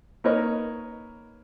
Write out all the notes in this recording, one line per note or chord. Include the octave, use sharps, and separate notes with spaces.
A#3 D#4 A#4 B4 C#5 D#5